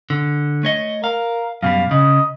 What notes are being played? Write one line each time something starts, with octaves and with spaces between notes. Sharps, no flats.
D3
A3 C#5 D#5
A#4 F5
F#2 B2 G3 F5
C#3 D#5